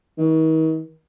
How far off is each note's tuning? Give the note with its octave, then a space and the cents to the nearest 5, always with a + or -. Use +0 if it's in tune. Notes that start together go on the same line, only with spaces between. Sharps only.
D#3 +40